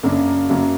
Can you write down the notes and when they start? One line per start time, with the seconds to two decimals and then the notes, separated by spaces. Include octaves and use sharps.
0.03 F#2 C#3 F#3 A#3 D4
0.50 F#2 C#3 F#3 A#3